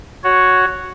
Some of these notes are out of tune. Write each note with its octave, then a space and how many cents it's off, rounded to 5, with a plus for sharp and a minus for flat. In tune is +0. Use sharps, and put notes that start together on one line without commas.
F#4 +0 C#5 +0